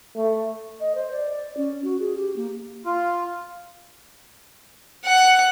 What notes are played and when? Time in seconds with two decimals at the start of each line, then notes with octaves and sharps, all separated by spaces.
0.15 A3
0.80 D#5
0.95 C5
1.11 D5
1.57 C#4
1.84 F#4
1.99 G#4
2.16 G4
2.36 A#3
2.86 F4
5.06 F#5